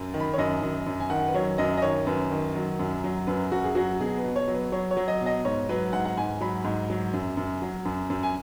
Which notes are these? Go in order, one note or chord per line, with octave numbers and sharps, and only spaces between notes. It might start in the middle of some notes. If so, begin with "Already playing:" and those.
Already playing: F#2
D#3
B5
C#5
F#2 D#5
F#2
F#2
G#5
D#3 F#5
B4
F#3 C#5
F#2 D#5
D#5
D#3 C#5
F#2 B4
D#3
F#3
F#2
F#3
F#2 B4
F#2 F#4
G#4
F#3 F#4
B2 G#4
B4
B2
C#5
F#3
B4
F#3 C#5
C#5
F#3
D#5
B2
D#5
G#2 C#5
F#3 B4
G#2 F#5
F#5
G#2 G#5
F#3 B5
G#2
F#3
F#2
F#2
F#3
F#2
F#2
G#5